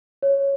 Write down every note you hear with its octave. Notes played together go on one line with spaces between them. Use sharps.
C#5